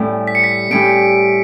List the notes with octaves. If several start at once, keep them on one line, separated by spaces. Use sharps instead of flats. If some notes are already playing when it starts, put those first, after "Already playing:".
Already playing: A2 G3 C#4 E4 G4
B6
C#7
B6
A2 G3 C#4 E4 G4 D7